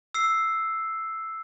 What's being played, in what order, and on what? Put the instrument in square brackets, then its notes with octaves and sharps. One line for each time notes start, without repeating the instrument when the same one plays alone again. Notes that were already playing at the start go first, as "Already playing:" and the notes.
[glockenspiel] E6 C7